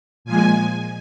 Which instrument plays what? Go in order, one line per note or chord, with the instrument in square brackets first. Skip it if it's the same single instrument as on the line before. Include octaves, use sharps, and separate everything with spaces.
[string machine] A#2 F3 G#3 G#5